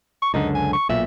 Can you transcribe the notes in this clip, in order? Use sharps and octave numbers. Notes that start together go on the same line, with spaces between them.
C#6
C#2 F#2 D3 D#4
G#5
C#6
B1 A#2 E5